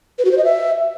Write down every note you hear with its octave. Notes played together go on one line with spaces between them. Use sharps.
B4
F#4
C5
D#5
E5